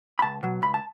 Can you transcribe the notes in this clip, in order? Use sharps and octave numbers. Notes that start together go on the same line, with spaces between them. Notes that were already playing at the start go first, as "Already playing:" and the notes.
B5
C#2 A5
B2 F#3
C#2 B5
A5